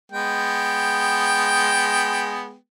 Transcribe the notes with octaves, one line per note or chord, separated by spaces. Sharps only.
G#3 B3 G5